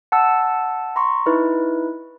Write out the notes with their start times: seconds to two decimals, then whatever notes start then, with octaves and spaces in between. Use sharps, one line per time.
0.12 F#5 A5 E6
0.96 A#5 C6 C#6
1.26 D#4 E4 B4